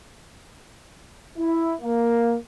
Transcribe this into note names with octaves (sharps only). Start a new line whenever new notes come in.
E4
A#3